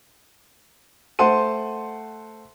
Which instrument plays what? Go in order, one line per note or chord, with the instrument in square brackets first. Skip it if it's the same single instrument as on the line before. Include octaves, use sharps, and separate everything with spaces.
[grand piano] A3 C5 F#5 A5 C6 D#7